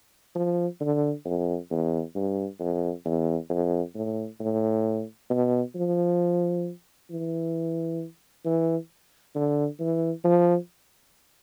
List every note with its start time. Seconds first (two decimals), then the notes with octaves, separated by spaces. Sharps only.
0.35 F3
0.80 D3
1.25 F2
1.70 E2
2.15 G2
2.60 F2
3.05 E2
3.50 F2
3.95 A2
4.40 A2
5.30 B2
5.75 F3
7.10 E3
8.45 E3
9.35 D3
9.80 E3
10.24 F3